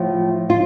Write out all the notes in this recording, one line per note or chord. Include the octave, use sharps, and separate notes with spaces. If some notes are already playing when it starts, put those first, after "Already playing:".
Already playing: A2 F3
F4